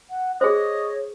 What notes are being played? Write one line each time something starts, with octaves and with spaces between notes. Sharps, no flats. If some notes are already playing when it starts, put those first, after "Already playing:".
F#5
G#4 C5 C#5 D#5